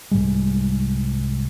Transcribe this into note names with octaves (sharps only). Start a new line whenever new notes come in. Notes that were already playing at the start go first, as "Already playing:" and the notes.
C2 G#2 G3 G#3